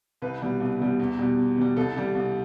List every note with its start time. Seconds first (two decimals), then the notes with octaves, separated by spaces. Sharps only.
0.22 C2 B4
0.42 B2 G3
0.60 C2
0.79 B2 G3
1.00 E2
1.19 B2 G3
1.38 E2
1.58 B2 G3
1.76 C2 A4
1.96 C3 G3
2.15 C2